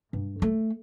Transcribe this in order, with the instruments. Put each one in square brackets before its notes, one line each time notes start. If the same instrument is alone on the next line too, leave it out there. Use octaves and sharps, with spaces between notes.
[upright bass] G2
A3